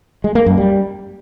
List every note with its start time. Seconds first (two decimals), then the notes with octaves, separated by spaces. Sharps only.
0.24 G#3
0.35 A#3
0.46 F#2
0.58 G3